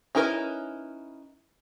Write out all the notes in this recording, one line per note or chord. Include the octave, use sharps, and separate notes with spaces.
C#4 D#4 E4 A#4 B4